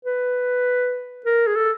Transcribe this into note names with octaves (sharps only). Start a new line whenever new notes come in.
B4
A#4
G#4
A4